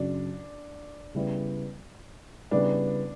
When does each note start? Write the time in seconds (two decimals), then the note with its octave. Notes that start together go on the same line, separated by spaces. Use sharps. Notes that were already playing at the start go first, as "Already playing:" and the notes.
Already playing: F#2 C#3 F#3 C#4 D4 F#4
1.15 C#3 G3 B3 E4
2.51 C#3 G3 B3 D4 E4